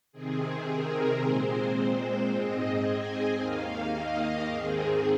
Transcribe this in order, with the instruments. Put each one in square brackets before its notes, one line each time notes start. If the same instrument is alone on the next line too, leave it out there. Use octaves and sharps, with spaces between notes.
[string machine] C3 D#3 C4 G#4
A#4
A#2 G#3 C4 C5
C5
G#2 G#3 C4 D#5
G#5
D#2 D#3 A#3 F5
D#5
G#2 D#3 G#3 C4 G#4